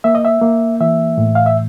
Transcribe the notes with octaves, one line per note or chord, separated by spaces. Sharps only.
A#3 E5
D#5
E5
A#3
E3 E5
A2
F5
E5